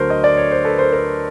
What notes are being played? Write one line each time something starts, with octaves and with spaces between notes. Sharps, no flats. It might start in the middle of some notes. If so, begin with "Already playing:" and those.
Already playing: D2 D3 F#3 A#4 C5
D#5
D5
C#5
C5
A4 B4
A#4 C5
A#4 C5